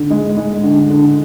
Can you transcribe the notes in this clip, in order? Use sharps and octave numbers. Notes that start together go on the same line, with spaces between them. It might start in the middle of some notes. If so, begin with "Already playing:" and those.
Already playing: D3
G#3
G#3
D3
D3